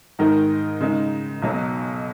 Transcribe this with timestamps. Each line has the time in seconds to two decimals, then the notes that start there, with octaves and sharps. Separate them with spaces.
0.19 G#2 D#3 G#3 D#4 A#4
0.81 C#3 G#3 D#4
1.42 B1 B2 F#3